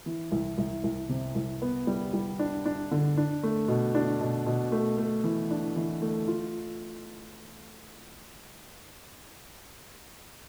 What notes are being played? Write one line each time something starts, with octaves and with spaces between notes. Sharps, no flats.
E3
C2
C2
C2
C3
C2
B3
G3
G3
D4
D4
D3
D4
A3
B2
D4
B2
B2
A3
A3
E3
D4
E3
A3
F4